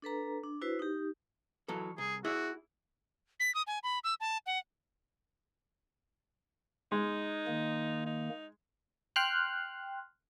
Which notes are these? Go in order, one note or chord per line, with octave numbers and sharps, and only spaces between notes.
D4 A4 B4 A#5
D4
E4 F#4 B4 C5
D#4 G4
E3 F#3 A4
C2 G#4
E4 F#4 G#4 E5
B6
D#6
G#5
B5
E6
A5
F#5
G#3 D#4
D#3 A#3
D#4
G5 C6 F6 F#6